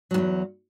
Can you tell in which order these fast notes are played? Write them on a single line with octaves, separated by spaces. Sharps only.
F#3 G#2 E2